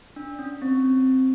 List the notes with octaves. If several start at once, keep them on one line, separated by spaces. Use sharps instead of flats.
D4
C#4
C4